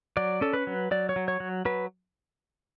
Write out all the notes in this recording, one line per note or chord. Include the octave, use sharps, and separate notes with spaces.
F#3 D5
C#4 A4
B4
F#3
F#3 D5
C#5
F#3
C#5
F#3
F#3 B4